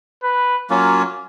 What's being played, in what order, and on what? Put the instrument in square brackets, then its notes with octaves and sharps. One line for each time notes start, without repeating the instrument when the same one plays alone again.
[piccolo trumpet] B4
[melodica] F#3 A#3 C#4 F4